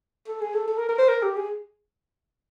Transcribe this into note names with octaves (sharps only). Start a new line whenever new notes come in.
A4
G#4
A4
A4
A#4
A#4
C5
A#4
G4
G#4